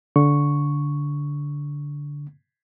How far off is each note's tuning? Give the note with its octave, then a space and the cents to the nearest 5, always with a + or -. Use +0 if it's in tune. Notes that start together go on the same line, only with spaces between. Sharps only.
D3 -15 C#6 +0